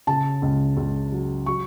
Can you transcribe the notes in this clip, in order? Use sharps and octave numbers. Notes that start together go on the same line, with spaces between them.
C#3 A5
C#2
C#2
F#3
F#3 C#6